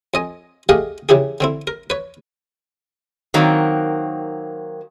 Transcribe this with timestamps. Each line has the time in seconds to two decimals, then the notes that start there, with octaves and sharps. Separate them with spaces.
0.14 F2 D#5 G#5
0.69 A3 G4 G#4 D#5 F5 F#5
1.09 C#3 E3 E4 G4 G#4
1.40 D3 C4 E4
1.67 A#4
1.90 B4 C#5
3.34 D#3 F#3 A#3 C4